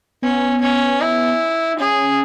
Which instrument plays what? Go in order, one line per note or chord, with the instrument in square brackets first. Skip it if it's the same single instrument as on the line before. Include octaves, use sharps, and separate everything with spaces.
[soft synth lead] B3 [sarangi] C#4
[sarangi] C#4
E4
[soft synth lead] D#4
[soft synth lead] C#4 [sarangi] G#4